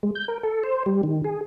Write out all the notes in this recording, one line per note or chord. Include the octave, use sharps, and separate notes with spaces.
G#3
G6
A#4
A4
C5
G3
D#3
G#4